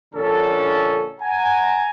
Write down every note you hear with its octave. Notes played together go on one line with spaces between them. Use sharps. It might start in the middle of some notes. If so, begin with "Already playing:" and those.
A#1 D3 C#4 A4
F#5 G#5 A#5